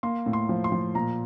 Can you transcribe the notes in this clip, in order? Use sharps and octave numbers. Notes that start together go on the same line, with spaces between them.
A#3 C6
A2
C6
F3
C6
F3
A#2 A#5